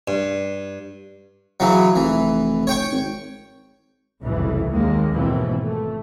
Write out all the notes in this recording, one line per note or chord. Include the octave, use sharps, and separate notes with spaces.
G2
C#3 E3 F#3
F1 E3
C#5 G5 C#6
G#1
F#1 C2 F2 A2 E3
G#1 D#2 G#3 A#3
G#1 D#2 B2 E3 F3 C4
A3